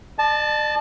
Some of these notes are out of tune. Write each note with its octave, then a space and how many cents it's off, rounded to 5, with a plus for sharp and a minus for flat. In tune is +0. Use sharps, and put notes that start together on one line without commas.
D5 +45 A5 -10